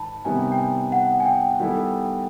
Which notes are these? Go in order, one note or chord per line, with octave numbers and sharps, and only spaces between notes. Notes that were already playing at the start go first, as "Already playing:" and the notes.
Already playing: G#2 D#3 A5 B5
C3 D#3 G3 B3 G#5
G5
G#5
F#5
G#5
G5
D#3 G3 B3 E4 A4